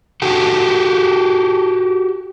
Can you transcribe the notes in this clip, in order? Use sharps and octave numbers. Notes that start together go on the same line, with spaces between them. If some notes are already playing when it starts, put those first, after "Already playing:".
F#4 G4 A4